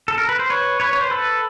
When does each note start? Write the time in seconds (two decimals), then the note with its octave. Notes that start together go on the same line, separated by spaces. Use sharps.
0.08 A4
0.18 A#4
0.29 B4
0.39 C5
0.50 B4 C#5
0.80 B4 C#5
0.93 C#5
1.01 C5
1.10 A4 B4